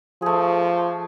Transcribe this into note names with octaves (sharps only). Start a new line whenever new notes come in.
F3 A3 G#4